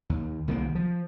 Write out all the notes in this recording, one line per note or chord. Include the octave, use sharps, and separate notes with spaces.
D#2
C2 D#3 F3 A#3
F3